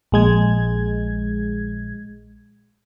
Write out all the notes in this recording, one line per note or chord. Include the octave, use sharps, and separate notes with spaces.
A#1 G#3 G#6